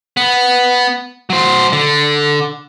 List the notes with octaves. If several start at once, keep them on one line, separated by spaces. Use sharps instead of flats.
B3
F#3 C5
D3